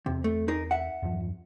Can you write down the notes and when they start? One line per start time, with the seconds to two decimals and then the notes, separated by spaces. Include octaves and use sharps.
0.06 E2 C3 C4
0.24 A3
0.48 D#4 G#4 A#4
0.71 E5 F#5
1.03 E2 G2 F3